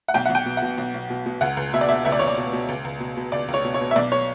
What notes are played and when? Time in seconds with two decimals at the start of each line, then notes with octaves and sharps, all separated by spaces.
0.08 F#5
0.14 B1 G5
0.25 B1 F#5
0.35 G5
0.46 B2
0.57 B2 F#5
0.78 B1
0.94 B1
1.10 B2
1.26 B2
1.41 C#2 F#5
1.57 C#2
1.73 B2 E5
1.81 D5
1.88 B2 E5
2.05 C#2 E5
2.12 D5
2.19 C#2 C#5
2.27 D5
2.37 B2
2.53 B2
2.68 C#2
2.85 C#2
3.00 B2
3.17 B2
3.32 C#2 D5
3.48 C#2
3.54 C#5
3.64 B2
3.74 C#5
3.81 B2
3.91 E5
3.96 B1 D5
4.12 C#5